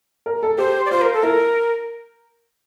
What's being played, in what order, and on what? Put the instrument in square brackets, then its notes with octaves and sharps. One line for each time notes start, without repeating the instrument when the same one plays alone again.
[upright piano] A#4
A4
[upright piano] G4 [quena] C5
[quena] D5
[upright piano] F4 [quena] C5
[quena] A#4
A4
[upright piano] E4 [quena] A#4